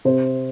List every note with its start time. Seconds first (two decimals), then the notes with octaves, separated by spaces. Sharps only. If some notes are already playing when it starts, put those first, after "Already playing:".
0.05 C3 C5